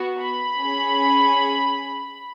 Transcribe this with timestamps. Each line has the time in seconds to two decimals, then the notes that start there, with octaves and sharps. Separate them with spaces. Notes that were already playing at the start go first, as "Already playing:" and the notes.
Already playing: B3 F#4
0.20 B5
0.61 C#4 G#4